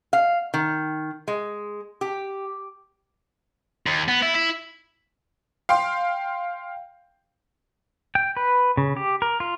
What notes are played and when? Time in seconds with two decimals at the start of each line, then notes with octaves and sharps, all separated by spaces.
0.13 F5
0.54 D#3
1.28 G#3
2.01 G4
3.87 D#2
4.08 B3
4.22 E4
4.35 E4
5.69 F5 G5 C6
8.15 G5
8.37 B4
8.77 C#3
8.97 G4
9.22 A#4
9.40 F4